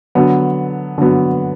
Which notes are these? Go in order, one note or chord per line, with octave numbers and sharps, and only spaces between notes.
D3 F#3 B3
D3 F#3 B3